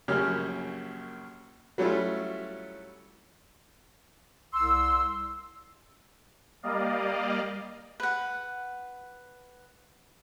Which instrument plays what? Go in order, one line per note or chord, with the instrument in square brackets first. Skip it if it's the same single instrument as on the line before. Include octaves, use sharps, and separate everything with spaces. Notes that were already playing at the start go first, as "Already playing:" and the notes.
[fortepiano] A#1 F#2 C#3 A#3 G4 F6
F#3 G3 A3 C#4 E4 F4
[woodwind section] C2 C6 E6
[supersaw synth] G3 A#3 D5 D#5 F5
[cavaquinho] B4 F#5